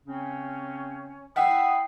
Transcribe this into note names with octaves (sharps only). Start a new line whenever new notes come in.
C#3 C4 C#4
E4 E5 F#5 G5 B5 D#6 C7